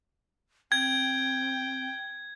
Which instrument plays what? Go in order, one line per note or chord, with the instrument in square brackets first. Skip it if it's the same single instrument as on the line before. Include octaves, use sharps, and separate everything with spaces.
[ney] C4 [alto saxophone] G5 [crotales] G#6